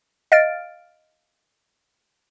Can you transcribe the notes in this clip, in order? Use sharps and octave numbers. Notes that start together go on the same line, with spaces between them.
D#5 F5 F6 A6 D7